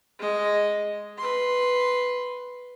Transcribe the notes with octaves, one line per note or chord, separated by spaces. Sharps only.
G#3 D#5
B4 C6